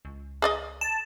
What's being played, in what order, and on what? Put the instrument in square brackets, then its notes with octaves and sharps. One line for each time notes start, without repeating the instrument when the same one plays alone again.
[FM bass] C#2
[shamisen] G#4 D5 D#5
[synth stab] A5